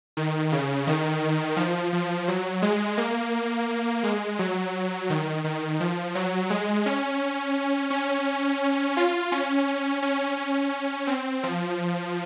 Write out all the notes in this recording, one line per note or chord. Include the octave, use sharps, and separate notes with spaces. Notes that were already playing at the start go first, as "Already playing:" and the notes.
D#3
C#3
D#3
F3
F3
F#3
G#3
A#3
G#3
F#3
D#3
D#3
F3
F#3
G#3
C#4
C#4
F4
C#4
C#4
C#4
C4
F3